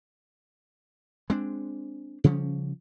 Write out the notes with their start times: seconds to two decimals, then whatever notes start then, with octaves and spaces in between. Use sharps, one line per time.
1.30 G#3 C4 D4
2.24 C#3 F3 G3 C#4